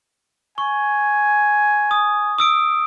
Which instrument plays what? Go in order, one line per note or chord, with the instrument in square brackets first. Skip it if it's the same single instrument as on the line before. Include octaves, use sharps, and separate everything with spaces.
[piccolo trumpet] G#5 [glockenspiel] C#6
[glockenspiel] D#6
D#6 E6 D7